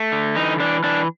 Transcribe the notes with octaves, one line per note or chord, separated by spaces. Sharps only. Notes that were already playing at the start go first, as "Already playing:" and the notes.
Already playing: A3
D3
E3 D#4
E3 D4
E3 D4